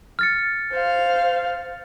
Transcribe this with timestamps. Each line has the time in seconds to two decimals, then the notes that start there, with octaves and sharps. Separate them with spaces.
0.19 F6 A6 C#7
0.72 C5 F5